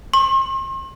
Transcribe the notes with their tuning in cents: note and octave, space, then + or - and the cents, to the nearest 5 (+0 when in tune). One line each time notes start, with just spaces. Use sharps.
C6 +45